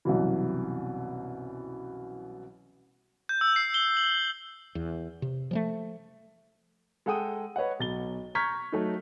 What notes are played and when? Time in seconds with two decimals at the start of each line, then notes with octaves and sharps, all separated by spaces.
0.05 C2 F#2 B2 E3
3.29 G6
3.41 E6
3.56 C7
3.74 G7
3.97 F#7
4.75 E2
5.22 C3
5.51 F3 G3 A3
7.06 G#3 A4 F#5 G5 D#6 D#7
7.56 B4 C#5 D#5 F#5
7.80 B1 A6 G7
8.35 A#5 C#6 F6 G6 G#6 B6
8.72 F#3 A3 D#4